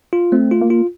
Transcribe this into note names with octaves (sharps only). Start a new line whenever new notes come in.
F4
A3 C4
F4
A#3
F4